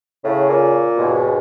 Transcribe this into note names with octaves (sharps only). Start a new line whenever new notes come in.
A2 C#3
A#2
D#2 G#2 B2